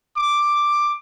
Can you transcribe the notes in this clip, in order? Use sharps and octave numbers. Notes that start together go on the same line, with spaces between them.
D6